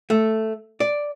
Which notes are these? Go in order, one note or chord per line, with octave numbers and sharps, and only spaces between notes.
A3
D5